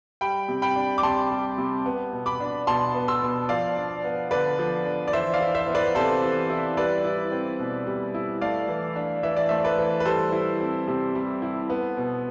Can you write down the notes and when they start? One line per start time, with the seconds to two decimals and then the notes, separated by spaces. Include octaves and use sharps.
0.21 G3 G5 B5
0.49 C3
0.62 G5 B5
0.76 D4
0.98 D6
1.03 C3 A5 C6
1.31 G3
1.58 C3
1.86 B3
2.13 B2
2.26 B5 D6
2.40 D4
2.67 B2 A5 C6
2.94 B3
3.08 C6 E6
3.22 B2
3.49 F3 D5 F5
3.76 D4
4.04 B3
4.31 D3 B4 D5
4.59 F3
4.86 D4
5.08 D5
5.13 E3 C5 E5
5.34 D5 F5
5.40 E4
5.54 C5 E5
5.68 B3
5.75 B4 D5
5.95 C3 A4 C5
6.23 E3
6.50 E4
6.77 G3 B4 D5
7.04 E4
7.32 C4
7.60 B2
7.87 G3
8.14 E4
8.41 A3 D5 F5
8.68 E3
8.96 D4
9.23 E3 E5
9.37 D5
9.49 A3 C5 E5
9.64 B4 D5
9.78 E3
10.00 B4
10.05 G3 A4 C5
10.32 E4
10.60 C4
10.88 C3
11.15 G3
11.42 E4
11.70 B3
11.97 B2